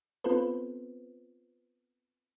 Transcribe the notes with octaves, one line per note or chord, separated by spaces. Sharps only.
B3 C4 F4 A4 B4 C5